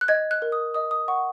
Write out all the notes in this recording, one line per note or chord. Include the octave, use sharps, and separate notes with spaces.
F#6
D#5 G#6
F#6
A#4
D#6
D#5 D#6
D#6
F#5 C#6